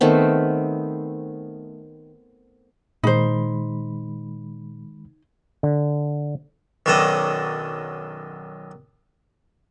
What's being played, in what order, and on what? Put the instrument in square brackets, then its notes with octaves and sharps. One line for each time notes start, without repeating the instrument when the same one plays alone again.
[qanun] D#3 A3 B3 C4
[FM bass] A#2 [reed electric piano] D#3 G#3 B5 [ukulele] D#4 C5
[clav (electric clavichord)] D3
[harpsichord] B1 F#2 D#3 D4 A4 D#5